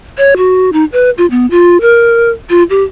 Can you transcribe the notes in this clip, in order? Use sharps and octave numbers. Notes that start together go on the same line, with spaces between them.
C#5
F#4
D#4
B4
F4
B3
F4
A#4
F4
G4